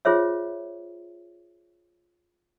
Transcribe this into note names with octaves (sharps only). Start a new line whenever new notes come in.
F4 G#4 C5 C#5 E5